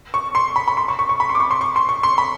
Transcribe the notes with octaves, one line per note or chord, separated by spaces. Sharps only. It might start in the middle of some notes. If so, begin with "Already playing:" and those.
C#6
C6
B5
B5
C6
C#6
C#6
C#6
B5
C6
D6
C#6
C6
C#6
C6
C#6
C6
B5